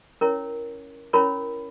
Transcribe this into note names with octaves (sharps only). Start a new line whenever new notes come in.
C#4 E4 A#4 C#5
C#4 E4 A#4 C#5 B5